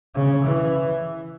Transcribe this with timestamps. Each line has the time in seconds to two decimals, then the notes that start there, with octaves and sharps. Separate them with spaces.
0.15 C#3
0.44 E3